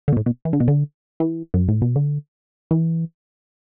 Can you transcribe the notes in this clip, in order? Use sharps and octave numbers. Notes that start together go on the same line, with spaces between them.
D3
B2
A2
B2
E3
D3
B2
D3
E3
F#2
A2
B2
D3
E3